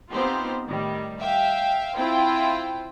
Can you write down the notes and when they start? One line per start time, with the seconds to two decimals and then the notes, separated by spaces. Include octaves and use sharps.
0.11 B3 C4 D#4 F4 G4 C5
0.67 A2 D#3 G3
1.19 E5 F5 G5
1.97 C4 E4 F4 C5 G5